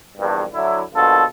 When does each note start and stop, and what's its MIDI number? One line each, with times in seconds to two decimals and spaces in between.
0.18 0.44 34
0.18 0.44 40
0.18 0.44 43
0.54 0.82 50
0.54 0.82 54
0.54 0.82 64
0.94 1.23 34
0.94 1.23 47
0.94 1.23 50
0.94 1.23 65
0.94 1.23 69